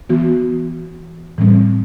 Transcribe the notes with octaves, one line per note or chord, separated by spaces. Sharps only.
E3 B3 F#4
A2 E3 G3 C4